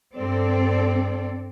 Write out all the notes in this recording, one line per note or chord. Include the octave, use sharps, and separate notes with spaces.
G2 C4 A4 D5